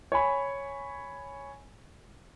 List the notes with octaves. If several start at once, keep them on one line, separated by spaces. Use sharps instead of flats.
C#5 G#5 B5